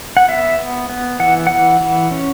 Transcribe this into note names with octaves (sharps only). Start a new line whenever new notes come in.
F#5
B3 E5
B3
B3
E3 F#5
E3 F#5
E3
C#4